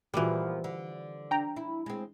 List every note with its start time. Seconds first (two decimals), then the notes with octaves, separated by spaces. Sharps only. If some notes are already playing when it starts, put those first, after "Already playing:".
0.14 A#2 E3 F3 G3 B3 F4 F#4 G#4
0.64 D3
1.31 D4 G5 A#5
1.56 E4
1.86 G#3 C4